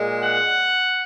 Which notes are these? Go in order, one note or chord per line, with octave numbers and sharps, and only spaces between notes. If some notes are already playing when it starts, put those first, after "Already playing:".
Already playing: A#2 G#3
F#5